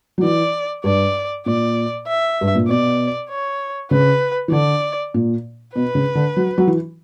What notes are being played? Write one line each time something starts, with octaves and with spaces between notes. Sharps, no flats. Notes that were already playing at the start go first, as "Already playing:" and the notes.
F#3
E3 D5
G2 D5
A#2 D5
E5
G2
A#2
B2 D5
C#5
C#3 B4
E3
D3 D5
A#2
B2 B4
C#3
D3
F#3
F#3
E3